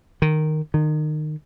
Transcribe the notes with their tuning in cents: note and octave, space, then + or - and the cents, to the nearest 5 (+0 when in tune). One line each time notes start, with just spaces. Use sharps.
D#3 -10
D#3 -25